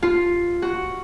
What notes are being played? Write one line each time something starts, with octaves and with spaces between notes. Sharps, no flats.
F4
F#4